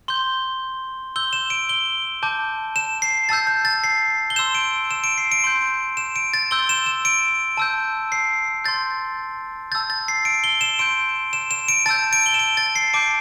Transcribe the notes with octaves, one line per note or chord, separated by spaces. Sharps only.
C6 G6 G7
C6 E6 G6 G7
E7
D7
G7
A5 D6 G6
E7
C7
A5 E6 G6 A6
G6
A6
C7
G7
C6 E6 G6 E7
D7
E7
D7
C7
D7
C6 G6
E7
D7
A6
C6 E6 G6 G7
E7
E7
D7
A5 E6 G6
C7
C6 G6 A6
A5 E6 G6 A6
A6
C7
D7
G7
E7
C6 G6 D7
E7
E7
D7
A5 E6 G6 A6
D7
G7
E7
D7
A6
C7
A5 D6 G6 D7